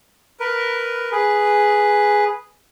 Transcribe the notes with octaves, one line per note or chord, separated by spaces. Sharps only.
A#4 B4
G#4 B4